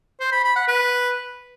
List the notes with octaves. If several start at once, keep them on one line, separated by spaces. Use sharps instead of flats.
C5
B5
B5
F#5
B4